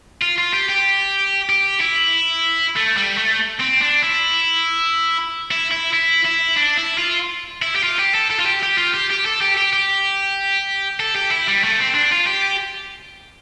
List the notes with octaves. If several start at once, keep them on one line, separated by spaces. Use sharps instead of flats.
F4
F4
G4
G4
G4
E4
A3
G3
A3
C4
D4
E4
E4
E4
E4
E4
D4
E4
F4
E4
G4
F4
G4
A4
A4
F4
G4
G4
F4
G4
G4
A4
G4
G4
G4
A4
G4
E4
G3
A3
C4
D4
F4
G4